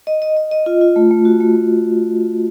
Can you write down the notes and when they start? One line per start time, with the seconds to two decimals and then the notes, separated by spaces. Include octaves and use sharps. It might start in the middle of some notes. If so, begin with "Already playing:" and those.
0.07 D#5
0.22 D#5
0.37 D#5
0.51 D#5
0.66 F4
0.81 F4
0.96 A3
1.11 A3
1.25 F#4
1.40 A3
1.55 A3